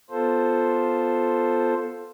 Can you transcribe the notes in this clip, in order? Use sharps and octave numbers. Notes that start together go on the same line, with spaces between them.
B3 F4 A4 C5